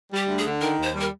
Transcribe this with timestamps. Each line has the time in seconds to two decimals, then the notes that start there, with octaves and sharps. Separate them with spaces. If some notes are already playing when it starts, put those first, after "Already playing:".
0.10 G3
0.16 G4
0.28 D2
0.38 G#4
0.44 D3
0.61 D#3 A#4
0.78 D#2
0.83 C5
0.95 G3
1.01 A#4